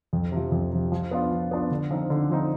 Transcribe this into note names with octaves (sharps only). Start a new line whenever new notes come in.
F2
C3 F3
F2
C3 F3
F3
B3 D4 F4
F3
B3 D4 F4
D3
F3 C4 D#4
D3
F3 C4 D#4